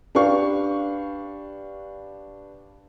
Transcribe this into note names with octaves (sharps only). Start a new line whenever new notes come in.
D4 G4 B4 F5 C#6